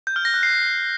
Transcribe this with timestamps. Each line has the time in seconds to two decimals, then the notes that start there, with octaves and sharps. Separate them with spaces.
0.07 G6
0.16 F6
0.25 A#6
0.34 F#6
0.43 C7